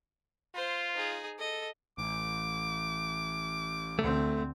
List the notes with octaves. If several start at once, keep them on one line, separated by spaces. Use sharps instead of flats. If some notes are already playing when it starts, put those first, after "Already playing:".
F4 C5
D#4 G#4
A4 D#5
A1 D6
D2 A3 C4